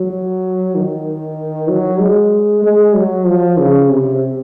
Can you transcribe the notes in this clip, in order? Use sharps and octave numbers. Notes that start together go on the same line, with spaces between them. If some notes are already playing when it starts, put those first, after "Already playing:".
Already playing: F#3
D#3
F#3
G#3
G#3
F#3
F3
C#3
C3